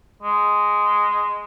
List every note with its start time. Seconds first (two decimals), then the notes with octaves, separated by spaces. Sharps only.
0.22 G#3